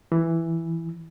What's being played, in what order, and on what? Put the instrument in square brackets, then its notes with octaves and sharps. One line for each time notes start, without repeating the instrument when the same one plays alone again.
[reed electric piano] E3